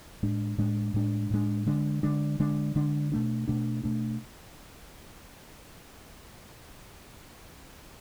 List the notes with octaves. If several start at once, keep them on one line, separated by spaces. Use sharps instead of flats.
A2 G#3 D4
A2 G#3 D4
A2 G#3 D4
A2 G#3 D4
D3 G#3 D4
D3 G#3 D4
D3 G#3 D4
D3 G#3 D4
B2 A3 D4
B2 A3 D4
B2 A3 D4